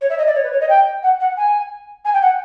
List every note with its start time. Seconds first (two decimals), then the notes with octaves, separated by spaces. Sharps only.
0.01 C#5
0.10 E5
0.18 D#5
0.27 D5
0.35 C#5
0.44 B4
0.52 C#5
0.61 D#5
0.69 G5
1.03 F#5
1.20 F#5
1.37 G#5
2.05 G#5
2.14 G5
2.22 F#5